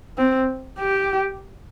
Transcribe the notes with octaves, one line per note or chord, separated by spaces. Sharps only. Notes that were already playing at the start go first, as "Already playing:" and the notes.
C4
G4